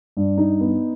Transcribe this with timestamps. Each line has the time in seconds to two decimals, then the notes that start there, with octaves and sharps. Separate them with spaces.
0.17 G2
0.38 D#4
0.61 B3